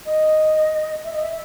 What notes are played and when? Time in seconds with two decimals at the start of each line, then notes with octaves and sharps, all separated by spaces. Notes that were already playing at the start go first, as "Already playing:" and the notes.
0.05 D#5
1.04 E5
1.13 D#5
1.21 E5